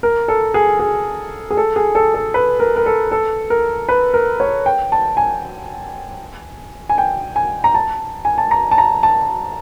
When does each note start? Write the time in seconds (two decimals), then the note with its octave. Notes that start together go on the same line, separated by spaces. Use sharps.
0.03 A#4
0.28 A4
0.54 G#4
0.80 G#4
1.51 G#4
1.57 A4
1.76 G#4
1.95 A4
2.14 A4
2.34 B4
2.60 A#4
2.76 A#4
2.86 A4
3.11 A4
3.50 A#4
3.89 B4
4.14 A#4
4.40 C#5
4.66 G5
4.92 A5
5.17 G#5
6.89 G#5
6.98 G5
7.36 G#5
7.64 A#5
7.74 A5
8.25 G#5
8.38 A5
8.51 A#5
8.71 A5
8.78 A#5
9.03 A5